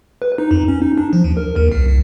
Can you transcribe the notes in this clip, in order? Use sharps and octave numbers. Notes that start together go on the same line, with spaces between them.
B4
D#4
F2
C#4
D#4
D4
F3
D#2
A#4
D#2
C2
C2